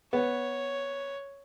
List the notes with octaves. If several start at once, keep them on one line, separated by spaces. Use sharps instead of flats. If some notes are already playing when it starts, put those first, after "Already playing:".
B3 C#5